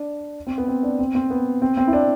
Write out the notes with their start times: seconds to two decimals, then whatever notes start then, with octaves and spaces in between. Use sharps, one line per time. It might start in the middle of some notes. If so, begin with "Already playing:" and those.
Already playing: D4
0.47 C4
0.58 B3
0.68 C4
0.83 D4
0.99 C4
1.15 C4
1.30 B3
1.62 C4
1.77 C4
1.87 E4
1.93 D4